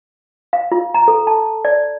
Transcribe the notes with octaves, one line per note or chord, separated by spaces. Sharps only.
F5
F4
A#5
A4
A5
D5